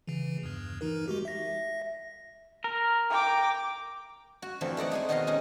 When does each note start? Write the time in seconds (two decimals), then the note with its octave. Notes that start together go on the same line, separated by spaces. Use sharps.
0.07 C#3 E3
0.43 E2 G2
0.81 E3 D#4 A#4
1.08 G#3 F#4 G4
1.25 E5 A#6
2.64 A#4
3.10 G5 D6
4.42 F#4
4.61 D3 E3 F3 A3 C4
4.77 A3 D#4 D5 F#5
4.91 G#3 G#4 G#5
5.09 B2 D#3 F#4 D#5 F5 C6
5.27 G#3 C#4 D#4